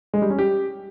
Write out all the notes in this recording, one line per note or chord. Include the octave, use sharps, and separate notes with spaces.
G#3
G3
C#4
G4